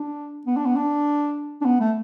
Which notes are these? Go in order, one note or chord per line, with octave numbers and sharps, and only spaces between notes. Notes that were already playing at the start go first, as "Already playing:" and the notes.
Already playing: D4
B3
D4
B3
D4
D4
B3
A3